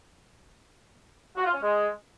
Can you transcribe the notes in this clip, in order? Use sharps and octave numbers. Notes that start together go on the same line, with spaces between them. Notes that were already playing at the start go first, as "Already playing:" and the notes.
F#4
F4
C#4
G#3